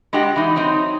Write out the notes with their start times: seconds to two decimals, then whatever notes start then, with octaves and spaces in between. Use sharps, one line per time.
0.13 G#3 D4 F#4 G4 D#5 F#5
0.36 E3 D#4
0.56 F#3 C4 D#4